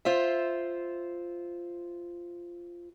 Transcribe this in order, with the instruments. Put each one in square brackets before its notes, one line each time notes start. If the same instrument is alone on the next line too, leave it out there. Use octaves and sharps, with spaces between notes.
[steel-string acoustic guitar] F4 C5 E5